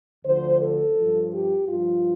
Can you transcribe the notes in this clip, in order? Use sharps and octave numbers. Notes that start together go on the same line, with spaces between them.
D2 D3 F3 C5
A4
G2 F3
G4
G2 F3 F4